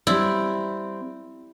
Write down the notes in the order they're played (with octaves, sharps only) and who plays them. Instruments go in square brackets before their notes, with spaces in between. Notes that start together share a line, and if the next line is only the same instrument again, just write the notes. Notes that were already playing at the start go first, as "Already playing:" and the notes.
[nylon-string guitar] G3 C4 D5 [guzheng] E4